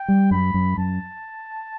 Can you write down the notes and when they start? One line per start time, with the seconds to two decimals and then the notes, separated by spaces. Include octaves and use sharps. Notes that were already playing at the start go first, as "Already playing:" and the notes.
Already playing: G5
0.08 G3
0.31 F#2 B5
0.54 F#2
0.78 F#2 A5